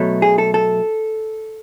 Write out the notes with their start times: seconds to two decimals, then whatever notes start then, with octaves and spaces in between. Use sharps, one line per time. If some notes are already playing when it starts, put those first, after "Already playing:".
Already playing: B2 F#3 A3
0.22 G#4
0.38 A4
0.54 A4